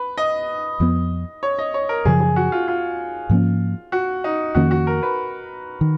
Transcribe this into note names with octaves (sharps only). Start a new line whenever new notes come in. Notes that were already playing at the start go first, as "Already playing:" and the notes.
Already playing: B4
D#5
F2 F3 B3
C#5
D#5
C#5
A#4
F#2 C#3 F3 G#4
G#4
F#4
F4
F4
G#2 F3 A#3 C#4
F#4
D#4
F2 D#3 A#3 C#4 F#4
F#4
A#4
B4
D#3